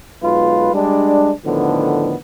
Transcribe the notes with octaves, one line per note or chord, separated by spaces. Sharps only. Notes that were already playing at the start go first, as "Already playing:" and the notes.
B1 G#3 F4 B4
G3 G#3 D4
A2 D3 D#3 F3 B3